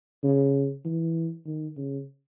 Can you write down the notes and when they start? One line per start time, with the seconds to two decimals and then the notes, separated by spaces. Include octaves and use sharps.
0.24 C#3
0.85 E3
1.46 D#3
1.77 C#3